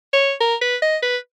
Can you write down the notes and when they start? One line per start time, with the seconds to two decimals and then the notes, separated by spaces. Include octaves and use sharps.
0.13 C#5
0.40 A#4
0.62 B4
0.82 D#5
1.03 B4